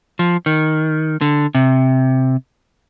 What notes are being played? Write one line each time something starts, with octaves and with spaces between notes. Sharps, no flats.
F3
D#3
D3
C3